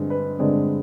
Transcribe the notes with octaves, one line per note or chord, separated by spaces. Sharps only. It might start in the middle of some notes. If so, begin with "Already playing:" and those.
Already playing: G2 D3 G#3 C4 G#4
B4
G2 D3 G#3 C4 D5